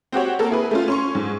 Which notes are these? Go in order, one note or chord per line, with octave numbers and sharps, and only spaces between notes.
C4 F#4 G4 C#5
A#3 A4 A#4
E4 G#4 B4
A3 C#4 F4
C#4 C6 C#6
G#2